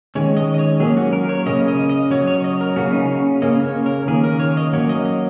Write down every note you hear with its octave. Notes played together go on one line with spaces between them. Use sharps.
D#3 G#3 C#4 C#5
D#5
D#5
C#5
F#3 A#3 C#4 G#4
F#4
A#4
C#5
C#3 A#3 C#4 D#5
D#5
D#5
F#3 C#4 C#5
C#5
D#5
A#4
C#3 A#3 C#4 F#4
D#4
F#4
C#3 A#3 C#4 D#5
C#5
A#4
D#3 A#3 C#4 G#4
A#4
C#5
D#5
F#3 A#3 C#4 C#5
D#5
D#5